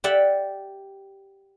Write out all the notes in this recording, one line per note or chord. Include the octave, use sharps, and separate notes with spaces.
G4 D5 E5 F#5